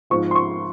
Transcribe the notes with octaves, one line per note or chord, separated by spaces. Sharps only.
G#2 F3 C4 F4 C#6
C6
C#6